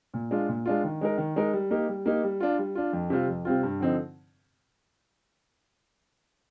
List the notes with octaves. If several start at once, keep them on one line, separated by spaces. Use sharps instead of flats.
A#2
G#3 D4 F4
A#2
G#3 D4 F4
D#3
G#3 D#4 A#4
D#3
G#3 D#4 A#4
G3
A#3 D#4 G4
G3
A#3 D#4 G4
G3
D4 F4
G3
D4 F4
F2
C3 G3 C4 F4
F2
C3 G3 C4 F4
G2
D3 F3 C4 D#4